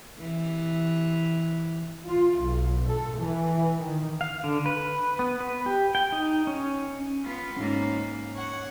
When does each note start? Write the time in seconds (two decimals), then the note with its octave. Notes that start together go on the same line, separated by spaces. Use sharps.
0.18 C3 E3
2.08 F4
2.41 B1
2.88 A4
3.18 E3
3.79 D#3
4.21 F5
4.44 D3
4.66 B4
5.19 B3
5.40 B4
5.66 G4
5.95 G5
6.12 D#4
6.47 C#4
7.25 B3 F4
7.57 G#2 A#3 C#4 D#4
8.36 C#5 F#5